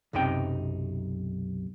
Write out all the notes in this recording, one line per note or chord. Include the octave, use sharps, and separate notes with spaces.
B1 F#2 C3 D#4 G5